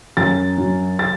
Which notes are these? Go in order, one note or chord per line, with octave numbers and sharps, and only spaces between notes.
F#2 A6
F#3
A6